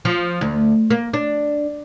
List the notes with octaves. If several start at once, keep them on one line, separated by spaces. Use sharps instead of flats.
F3
D2
A#3
D4